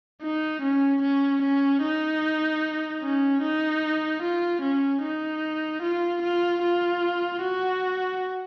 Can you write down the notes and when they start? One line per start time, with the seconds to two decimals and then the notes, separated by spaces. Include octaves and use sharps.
0.22 D#4
0.62 C#4
1.02 C#4
1.42 C#4
1.82 D#4
3.02 C#4
3.42 D#4
4.22 F4
4.62 C#4
5.02 D#4
5.82 F4
6.22 F4
6.62 F4
7.42 F#4